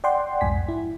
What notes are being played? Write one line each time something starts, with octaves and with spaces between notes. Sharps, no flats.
D5 F#5 G5 C6
B1 F2 G#2 G#5 B6
E4